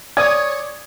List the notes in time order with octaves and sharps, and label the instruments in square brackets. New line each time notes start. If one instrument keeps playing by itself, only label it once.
[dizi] C#5 [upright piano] D5 [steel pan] G#5 D#6 [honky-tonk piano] G#6